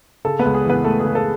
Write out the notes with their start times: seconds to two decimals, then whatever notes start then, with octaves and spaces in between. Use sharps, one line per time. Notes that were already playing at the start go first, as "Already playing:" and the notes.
0.25 C#3 A4
0.39 B3 B4
0.45 C#2
0.54 G#4
0.65 E3 B3 B4
0.84 A3 A4
1.00 G#4
1.05 C#3
1.15 A4